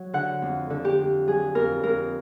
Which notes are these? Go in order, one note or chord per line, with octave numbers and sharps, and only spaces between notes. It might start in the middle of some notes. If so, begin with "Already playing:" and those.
Already playing: F#3
D3 F#5
F2
D3
G4
F2
F#3 G#4
F2 A#4
F2 A#4